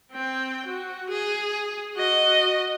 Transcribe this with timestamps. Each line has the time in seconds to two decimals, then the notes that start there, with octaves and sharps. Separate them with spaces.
0.12 C4 G5
0.67 F#4
1.10 G#4
1.97 F#4 D#5